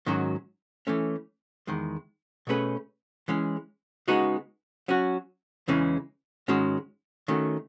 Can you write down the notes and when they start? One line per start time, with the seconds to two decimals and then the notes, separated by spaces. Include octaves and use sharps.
0.06 G#2 D#3 F#3 C#4 F#4
0.87 E3 A3 C#4
1.67 E2 D#3 G#3
2.47 B2 A3 C#4 G#4 B4
3.28 E3 G#3 C#4
4.08 C#3 G#3 B3 D#4 F#4
4.88 F#3 C#4 F#4
5.68 E2 C#3 E3 G#3 C#4
6.48 G#2 D#3 G#3 C#4 F#4
7.28 D#3 A3 C#4 F#4